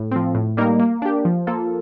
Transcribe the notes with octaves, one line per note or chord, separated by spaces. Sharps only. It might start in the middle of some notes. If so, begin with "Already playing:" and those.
Already playing: A2
F3 C4
A2
G3 A#3 D#4 A#4
A#3
D4 G4
F3
A#3 F4 A4